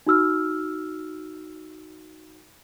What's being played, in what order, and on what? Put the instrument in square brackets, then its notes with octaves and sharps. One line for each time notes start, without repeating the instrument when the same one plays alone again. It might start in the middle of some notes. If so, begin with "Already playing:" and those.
[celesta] D#4 F#4 E6 F6